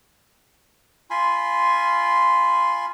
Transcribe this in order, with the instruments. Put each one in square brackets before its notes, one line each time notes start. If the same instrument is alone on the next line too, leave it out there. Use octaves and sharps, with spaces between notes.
[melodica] F4 G#5 B5 C6